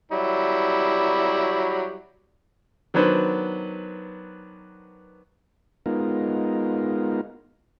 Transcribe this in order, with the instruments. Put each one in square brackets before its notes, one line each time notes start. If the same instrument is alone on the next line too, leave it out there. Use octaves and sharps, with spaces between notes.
[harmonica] F#3 G3 E4
[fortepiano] D#3 F#3 B3 D4 B4 C5
[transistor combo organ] G#3 B3 D#4 F4 A#4